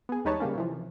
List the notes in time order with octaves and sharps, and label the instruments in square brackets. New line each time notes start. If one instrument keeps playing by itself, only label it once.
[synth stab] B3 G#4
D#2 G3 D#4 B4 C#5 A5
C#3 G3 A#3 C#4
C3 E3 F3